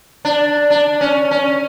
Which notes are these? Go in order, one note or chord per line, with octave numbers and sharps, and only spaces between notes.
D4
D4
C#4
C#4